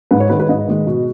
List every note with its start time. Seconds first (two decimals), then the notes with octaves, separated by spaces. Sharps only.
0.11 G#2 B4
0.20 C#5
0.30 D#3 G#3 B4
0.40 B4
0.49 G#2 D#5
0.68 D#3 G#3
0.87 B2